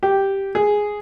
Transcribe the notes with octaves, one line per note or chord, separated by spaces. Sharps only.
G4
G#4